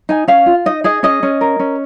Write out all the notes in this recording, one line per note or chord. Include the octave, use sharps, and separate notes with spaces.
D#4 G#5
C#4 F5
F4
D#4 D#5
G#4 D#5
C#4 D#5
C#4
A#4
C#4